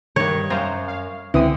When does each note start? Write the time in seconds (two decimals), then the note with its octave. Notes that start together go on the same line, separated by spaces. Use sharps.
0.16 G2 D#3 C#5
0.50 F#2 C5 F5 A#5
0.88 F5
1.34 C#2 D3 E3 C4 D#6